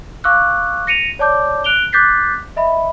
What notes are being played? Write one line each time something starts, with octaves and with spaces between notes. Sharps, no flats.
F5 C#6 D6 E6 F#6
A#6 C#7 D#7 F7
C#5 D5 A5 D6 G6
F#6 D7 F7 G7
D6 F#6 G6 A6 B6 C7
D#5 E5 B5